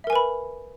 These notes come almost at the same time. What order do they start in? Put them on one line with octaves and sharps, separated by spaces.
E5 A#4 G#5 B4 B5